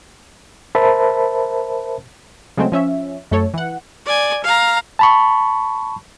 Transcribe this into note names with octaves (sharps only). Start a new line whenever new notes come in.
A#4 C5 E5 A5 B5
C#3 F#3 G#3 A3 C4
F3 C#4 E5
F#2 A3 A4 C#5
E3 F#5
D5 G#5
F5 A#5
A5 B5 C#6